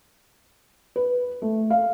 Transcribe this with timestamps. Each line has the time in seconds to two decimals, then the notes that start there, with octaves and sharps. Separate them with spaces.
0.96 B4
1.42 A3
1.70 F5